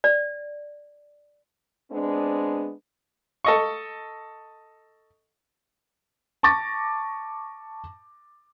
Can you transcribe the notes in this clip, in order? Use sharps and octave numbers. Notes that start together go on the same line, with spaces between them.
D5
G#3 B3 C4 D4
A4 D#5 C#6
A5 C#6 D6 A6 A#6